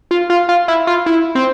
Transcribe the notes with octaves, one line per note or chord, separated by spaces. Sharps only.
F4
F4
F4
E4
F4
E4
C4